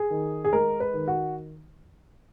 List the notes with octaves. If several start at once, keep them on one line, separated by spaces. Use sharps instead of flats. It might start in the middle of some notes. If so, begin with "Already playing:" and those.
Already playing: G#4
D#3
G#4
G#3 A#4
B4
D#3
F#4